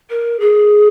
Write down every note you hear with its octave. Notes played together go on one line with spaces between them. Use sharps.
A#4
G#4